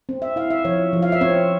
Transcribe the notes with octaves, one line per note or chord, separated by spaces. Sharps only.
C4
E5
E4 F5
E5
F3 C#5
F3
F5
E5
C4 C#5